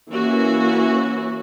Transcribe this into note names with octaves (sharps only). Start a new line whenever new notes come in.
E3 A#3 C#4 F#4